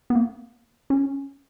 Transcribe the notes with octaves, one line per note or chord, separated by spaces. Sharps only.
B3
A#3
C#4